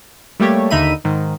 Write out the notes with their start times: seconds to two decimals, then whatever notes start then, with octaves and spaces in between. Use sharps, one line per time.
0.40 G3 A3 A#3 G4 C#5
0.71 D#2 D3 D#4 E5 B5 D#7
1.04 G#2 D#3